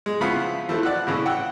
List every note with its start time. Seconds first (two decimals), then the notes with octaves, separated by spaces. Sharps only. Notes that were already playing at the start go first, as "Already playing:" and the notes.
0.06 G#3
0.21 C#3 F3 B3 E4 F5 B5
0.69 E3 F3 A3
0.83 D5 F#5 E6 F#6
1.07 A2 C#3 E3
1.26 F#5 G5 E6